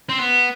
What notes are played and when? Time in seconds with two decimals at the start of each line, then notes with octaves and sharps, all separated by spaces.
0.09 C4
0.19 B3